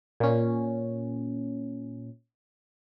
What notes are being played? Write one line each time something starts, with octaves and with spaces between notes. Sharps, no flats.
A#2 C#4